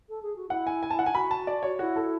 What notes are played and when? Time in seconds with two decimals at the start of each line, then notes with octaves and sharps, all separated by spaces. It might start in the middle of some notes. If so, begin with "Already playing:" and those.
0.09 A4
0.22 G#4
0.36 F#4
0.50 E4 F#5
0.67 G#5
0.83 G#5
0.90 A5
0.99 F#5
1.06 E4 G#5
1.14 F#4 B5
1.31 A5
1.47 D5
1.63 C#5
1.79 E4 F#4
1.96 A4